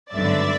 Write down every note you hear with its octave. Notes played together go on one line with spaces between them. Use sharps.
G#1 G2 D3 F#3 B3 D5 E5